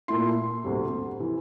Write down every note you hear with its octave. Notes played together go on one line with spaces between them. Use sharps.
A#2 A3 E4 C6
D2 C3 G3
C3 E3